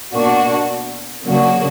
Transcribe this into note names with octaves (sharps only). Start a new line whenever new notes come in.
B2 A#3 D4 F#4
C#3 F#3 A#3 D4 F#4